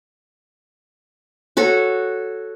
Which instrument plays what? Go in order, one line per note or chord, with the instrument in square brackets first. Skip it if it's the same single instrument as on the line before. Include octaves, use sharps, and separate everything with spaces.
[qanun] F#4 A4 C#5